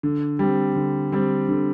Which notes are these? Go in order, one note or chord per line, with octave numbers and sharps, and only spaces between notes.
D3
G3 C4
D3
G3 C4
D3